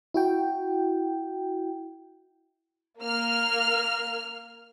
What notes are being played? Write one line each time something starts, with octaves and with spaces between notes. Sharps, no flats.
E4 F#4 G5
A#3 F6